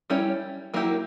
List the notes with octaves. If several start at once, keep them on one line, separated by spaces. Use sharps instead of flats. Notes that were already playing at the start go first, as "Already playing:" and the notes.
G3 C#4 E4 G4 C#5
F#3 A#3 E4 G4